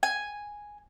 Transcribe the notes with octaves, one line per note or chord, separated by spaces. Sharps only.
G#5